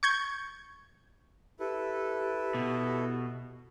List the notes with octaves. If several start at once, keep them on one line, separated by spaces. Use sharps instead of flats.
C#6 G6 G#6
E4 G4 A4 B4
B2